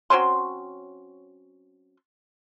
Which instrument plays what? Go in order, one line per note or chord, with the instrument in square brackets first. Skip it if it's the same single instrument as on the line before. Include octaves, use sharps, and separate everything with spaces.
[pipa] F#3 C4 C#4 C6